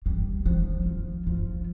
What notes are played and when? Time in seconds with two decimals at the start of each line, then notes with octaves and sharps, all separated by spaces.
0.06 G3
0.46 F3
0.86 F3
1.27 F3